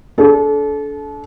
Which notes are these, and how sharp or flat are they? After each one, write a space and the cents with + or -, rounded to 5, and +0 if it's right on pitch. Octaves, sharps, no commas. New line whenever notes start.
D4 -30 A4 -30